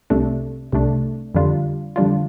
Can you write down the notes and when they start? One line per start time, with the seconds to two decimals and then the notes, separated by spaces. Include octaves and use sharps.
0.10 C2 C3 A3 D4
0.73 C2 C3 A3 D4
1.35 F2 D3 G3 D4 F4
1.96 F2 D3 G3 D4 F4